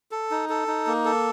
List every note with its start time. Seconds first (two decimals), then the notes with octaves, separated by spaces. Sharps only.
0.11 A4
0.31 D#4
0.49 A4
0.68 D#4
0.87 A#3
1.05 A4